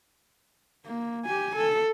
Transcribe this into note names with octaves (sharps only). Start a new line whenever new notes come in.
A#3
G4 G#5
A4